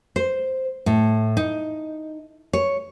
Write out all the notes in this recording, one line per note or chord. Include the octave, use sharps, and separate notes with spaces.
C5
A2
D#4
C#5